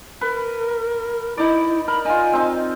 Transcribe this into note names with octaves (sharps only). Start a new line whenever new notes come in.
A#4 B4
D#4 E4 D5
A#4 B5
D#4 F4 G#5
C4 D#4